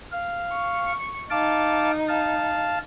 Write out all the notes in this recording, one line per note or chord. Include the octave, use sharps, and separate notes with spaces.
F5
C#6
D#4 F5 A5 D6
F5 A5